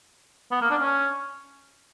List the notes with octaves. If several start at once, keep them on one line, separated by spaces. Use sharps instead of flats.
B3
A#3
D4
C#4